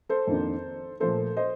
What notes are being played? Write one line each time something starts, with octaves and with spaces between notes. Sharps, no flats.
A4 C5
F2 D#3 A#3 D4
A#2 F3 A3 A4 C5
C5 D#5